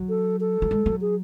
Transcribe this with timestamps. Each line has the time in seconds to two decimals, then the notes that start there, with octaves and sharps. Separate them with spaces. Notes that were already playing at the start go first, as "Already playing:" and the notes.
Already playing: F#3
0.09 A4
0.40 A4
0.62 F#3
0.71 G#3
0.86 F#3
1.01 G#4